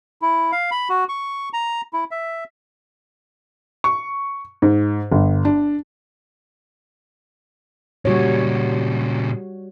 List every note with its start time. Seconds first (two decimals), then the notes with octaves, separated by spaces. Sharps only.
0.22 E4
0.52 F5
0.71 B5
0.89 F#4
1.09 C#6
1.53 A#5
1.93 E4
2.11 E5
3.84 C#6
4.62 G#2
5.12 G1
5.45 D4
8.05 A#2 C#3 G3 F#4 C#5